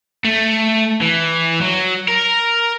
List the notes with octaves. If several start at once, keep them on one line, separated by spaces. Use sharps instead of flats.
A3
E3
F#3
A#4